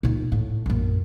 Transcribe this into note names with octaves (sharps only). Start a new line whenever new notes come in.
A#2 D#4
A2
A#1 F#2